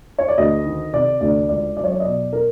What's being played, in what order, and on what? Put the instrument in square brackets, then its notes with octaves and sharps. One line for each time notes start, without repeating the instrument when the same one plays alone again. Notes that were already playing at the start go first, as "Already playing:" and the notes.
[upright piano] C#5
D5
D2 D#5
D#3
C3 D5
D2 D5
C#2 D5
F#3 D5
C#5
D5
D#5
B2 D5
A#4